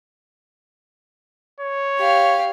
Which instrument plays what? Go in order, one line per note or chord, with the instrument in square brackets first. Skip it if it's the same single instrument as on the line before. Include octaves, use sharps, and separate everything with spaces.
[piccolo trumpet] C#5
[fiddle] G4 F5